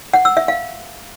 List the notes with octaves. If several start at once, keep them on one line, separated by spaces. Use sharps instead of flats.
F#5
E6
E5
F5